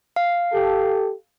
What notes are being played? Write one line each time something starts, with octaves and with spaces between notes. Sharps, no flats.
F5
G4 A4